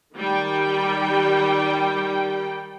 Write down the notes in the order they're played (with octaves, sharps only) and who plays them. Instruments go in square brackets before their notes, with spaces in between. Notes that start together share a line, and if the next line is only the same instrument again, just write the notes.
[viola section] D#3 G3 G5